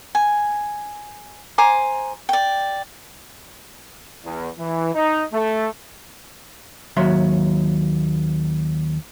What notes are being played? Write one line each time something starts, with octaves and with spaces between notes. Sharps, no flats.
G#5
C5 G#5 A#5 D6
D5 G5
E2
E3
D#4
A3
D#2 F#3 E5 C6